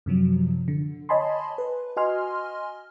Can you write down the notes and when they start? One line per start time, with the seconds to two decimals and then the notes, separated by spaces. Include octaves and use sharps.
0.06 F#2 C3 F3 F#3
0.68 D3
1.09 C#5 D#5 G#5 A5 B5 C6
1.58 B4
1.97 F#4 D#5 G#5 C6 F6